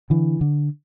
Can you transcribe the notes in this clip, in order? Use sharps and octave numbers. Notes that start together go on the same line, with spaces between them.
D3 E3
D3